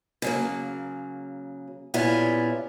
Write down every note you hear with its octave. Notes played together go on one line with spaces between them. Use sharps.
C#3 F#3 A#3
A#2 B3 C#4 E4 F4 G4